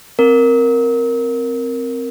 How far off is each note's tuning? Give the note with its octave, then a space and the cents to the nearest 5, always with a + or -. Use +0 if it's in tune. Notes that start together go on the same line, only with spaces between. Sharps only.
C4 +0 A#4 +0